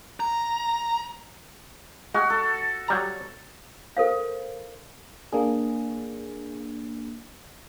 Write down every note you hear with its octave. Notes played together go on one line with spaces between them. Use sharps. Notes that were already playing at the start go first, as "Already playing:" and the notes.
A#5
G#3 F#4
A4
F#3 G3 A#5
A4 A#4 C5 F5
A#3 D4 G#4